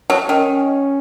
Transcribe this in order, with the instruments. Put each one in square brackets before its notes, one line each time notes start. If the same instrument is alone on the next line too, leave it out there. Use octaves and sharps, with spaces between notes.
[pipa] F#3
[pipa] D#3 [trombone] C#4